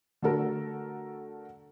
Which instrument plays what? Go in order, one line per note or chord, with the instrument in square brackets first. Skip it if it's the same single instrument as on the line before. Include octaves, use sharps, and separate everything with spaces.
[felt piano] D3 A3 F#4 A4 A#4